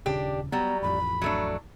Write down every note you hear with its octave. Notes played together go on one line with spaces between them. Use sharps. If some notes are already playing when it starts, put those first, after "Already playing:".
D#1 C#3 D4 G4
F#3 G3 B3 A#5
D#1 A1 F2 B5
F#3 A3 D4